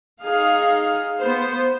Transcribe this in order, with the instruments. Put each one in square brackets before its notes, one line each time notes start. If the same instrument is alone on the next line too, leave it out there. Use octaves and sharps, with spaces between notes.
[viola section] D#4 G#4 F5
B3 C5